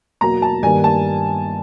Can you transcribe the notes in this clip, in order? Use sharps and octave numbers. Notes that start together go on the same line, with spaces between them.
E2 B2 F#3 A#3 A#5
A5
G2 D#3 G3 A#3 G#5
A5